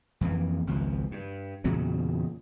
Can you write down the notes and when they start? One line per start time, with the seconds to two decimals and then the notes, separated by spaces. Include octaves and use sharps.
0.21 F2 E3 A#3
0.67 G#1 C#2 F3
1.11 G2
1.64 E2 A#2 C#3 F#3